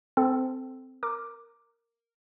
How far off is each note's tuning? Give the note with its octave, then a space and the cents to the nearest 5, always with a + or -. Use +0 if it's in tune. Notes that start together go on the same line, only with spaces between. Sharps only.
C4 -15 A4 +0 C5 +0
A#4 -10 D6 +0